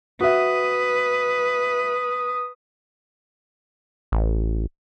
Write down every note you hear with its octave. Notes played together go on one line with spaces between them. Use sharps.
F#4 B4 E5 D#6
A1